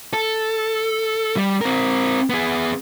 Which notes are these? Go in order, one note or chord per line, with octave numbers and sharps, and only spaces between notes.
A4
G3
C4 A#4
B3 G#4